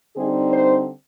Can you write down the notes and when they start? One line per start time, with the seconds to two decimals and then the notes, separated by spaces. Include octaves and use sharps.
0.16 D3 G3 C4 D#4 G#4
0.53 C5